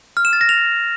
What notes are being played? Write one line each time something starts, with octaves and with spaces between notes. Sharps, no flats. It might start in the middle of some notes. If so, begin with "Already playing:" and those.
F6
E7
A6
A#6
F7